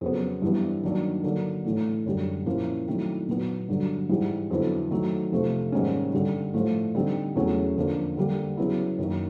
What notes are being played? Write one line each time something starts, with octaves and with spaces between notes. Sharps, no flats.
F2 C#3 F#3 B3
G2 E3 G3 B3
G2 D#3 F#3 A#3 D4
D3 F#3 A#3 D4
A2 E3 A3
F#2 D3 G3
A#2 F3 A#3 C#4 E4
D#3 F#3 A3 C4 E4
A#2 F#3 B3
G2 D3 F#3
G#2 E3 G3
F2 D3 F#3 B3 E4
D#3 F#3 A3
F2 C3 F3 A3
G#2 D#3 G3 A#3 C#4
G2 D3 G3
A2 F3 A3
D3 G3 C4 D#4
E2 C#3 F#3 A3 C#4
F2 D3 F3 A#3 D4
D3 G3 A#3
C#3 F#3 B3 E4
F#2 D#3 F#3 A#3